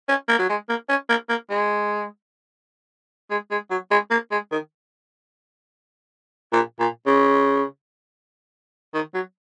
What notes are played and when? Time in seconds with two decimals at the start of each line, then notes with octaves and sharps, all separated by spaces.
0.08 C#4
0.28 A#3
0.39 F#3
0.50 G#3
0.69 A#3
0.89 C#4
1.09 A#3
1.29 A#3
1.50 G#3
3.30 G#3
3.51 G#3
3.70 F#3
3.91 G#3
4.11 A#3
4.31 G#3
4.52 D#3
6.53 A#2
6.79 A#2
7.06 C#3
8.94 D#3
9.14 F#3